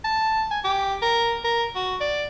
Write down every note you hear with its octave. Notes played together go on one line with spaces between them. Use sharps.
A5
G#5
G4
A#4
A#4
F#4
D5